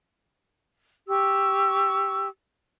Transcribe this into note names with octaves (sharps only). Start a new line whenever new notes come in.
G4 C#6 E6